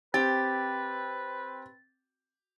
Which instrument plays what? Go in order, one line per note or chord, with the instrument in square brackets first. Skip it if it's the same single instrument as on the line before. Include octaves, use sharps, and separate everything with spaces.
[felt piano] C4 [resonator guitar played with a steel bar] G4 [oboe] B4 [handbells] A6